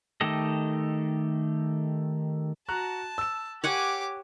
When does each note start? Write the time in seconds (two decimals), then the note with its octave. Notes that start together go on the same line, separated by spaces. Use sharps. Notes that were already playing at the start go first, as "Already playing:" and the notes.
0.21 D#3 A3 G4 A4 D#5
2.69 F#4 A5 A#5 F#6
3.18 E6 E7
3.64 G4 C#5 F#5 G#5 D6